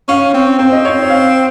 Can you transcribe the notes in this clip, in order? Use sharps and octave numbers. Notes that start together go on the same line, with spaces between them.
C#4 F5
C4
C4 C5
D#5
C#5
F5